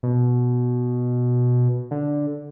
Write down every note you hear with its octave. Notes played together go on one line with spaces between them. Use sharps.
B2
D3